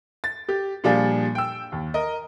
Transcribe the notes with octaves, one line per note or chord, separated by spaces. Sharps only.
A6
G4
A#2 F3 G3 D4 G#4
G5 E6
D#2
A#4 D#5